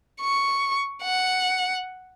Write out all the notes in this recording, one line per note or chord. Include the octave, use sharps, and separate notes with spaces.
C#6
F#5